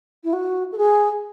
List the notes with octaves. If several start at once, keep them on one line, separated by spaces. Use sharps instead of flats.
E4
F#4
A4
G#4